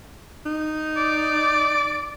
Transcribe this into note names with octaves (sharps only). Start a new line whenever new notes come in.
D#4
D5